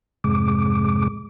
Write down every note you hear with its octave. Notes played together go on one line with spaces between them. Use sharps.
F2 G#2 C3 G#3 D6